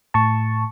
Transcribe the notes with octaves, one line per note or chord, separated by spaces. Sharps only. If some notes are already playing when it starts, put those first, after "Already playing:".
A2 A5 C#6